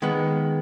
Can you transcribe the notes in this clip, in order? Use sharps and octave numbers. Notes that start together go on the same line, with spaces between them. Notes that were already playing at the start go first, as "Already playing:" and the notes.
D#3 G#3 B3